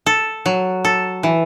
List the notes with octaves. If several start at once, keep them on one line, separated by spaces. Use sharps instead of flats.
A4
F#3
A4
E3